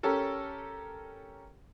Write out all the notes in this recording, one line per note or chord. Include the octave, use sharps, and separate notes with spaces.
C#4 G4 A4 A#4